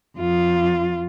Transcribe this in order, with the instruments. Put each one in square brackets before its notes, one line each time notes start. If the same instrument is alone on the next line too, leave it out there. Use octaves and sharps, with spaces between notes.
[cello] F2 F4